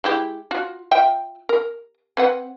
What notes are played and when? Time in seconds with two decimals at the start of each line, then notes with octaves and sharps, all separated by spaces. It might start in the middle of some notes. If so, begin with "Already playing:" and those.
0.04 G#3 E4 G4
0.51 F4 F#4
0.91 F4 E5 G5
1.49 A#4
2.17 C4 B4 F#5